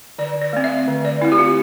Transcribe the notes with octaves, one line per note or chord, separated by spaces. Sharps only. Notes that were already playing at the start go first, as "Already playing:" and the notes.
D3 D5
D5
A3 C4
E5
D3
D5
A3 C4 E4
G4
F4